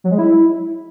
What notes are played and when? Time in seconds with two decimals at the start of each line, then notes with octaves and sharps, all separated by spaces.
0.04 F#3
0.11 G#3
0.18 E4